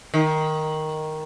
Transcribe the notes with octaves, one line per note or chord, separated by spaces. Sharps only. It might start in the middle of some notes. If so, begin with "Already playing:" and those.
D#3